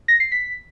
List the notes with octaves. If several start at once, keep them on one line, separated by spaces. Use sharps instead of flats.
A#6
C7
B6